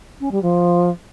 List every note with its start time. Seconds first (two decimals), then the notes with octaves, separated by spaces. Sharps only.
0.20 C#4
0.31 G3
0.42 F3